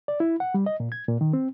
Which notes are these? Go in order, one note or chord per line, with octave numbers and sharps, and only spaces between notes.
D5
E4
F#5
G3
D#5
A#2
G#6
A#2
D#3
C4